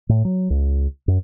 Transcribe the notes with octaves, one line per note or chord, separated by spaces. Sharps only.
A2
F#3
C#2
F#2